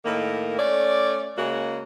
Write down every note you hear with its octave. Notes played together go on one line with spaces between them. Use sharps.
A2 D#3 A#3
A3 C#4 D5
C#3 G#3 A#3 F#4